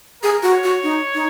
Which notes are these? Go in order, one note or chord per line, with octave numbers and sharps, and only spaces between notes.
G#4 A#4
F#4
C#5
F#4
D#4
D#4